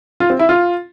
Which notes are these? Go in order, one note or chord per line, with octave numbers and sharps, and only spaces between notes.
F4
C4
E4
F4